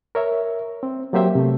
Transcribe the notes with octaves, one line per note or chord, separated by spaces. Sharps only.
A#4 C#5 E5
C4
F#3 A#3 G4 C5 E5 G5
C3 A3